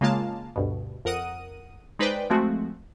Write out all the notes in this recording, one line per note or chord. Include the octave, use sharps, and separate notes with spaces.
C#3 G#3 A#3 F4 F5 A5
D2 G2 B2
F2 A#4 F#5 D#6 D#7
G#3 D#4 B4 C5 D5 G5
F3 G#3 A3 C4 F#4